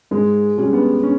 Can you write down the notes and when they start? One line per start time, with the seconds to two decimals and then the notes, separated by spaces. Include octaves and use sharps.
0.11 G#2 G#3
0.57 G3 C#4 G#4
0.73 B3
1.03 C#4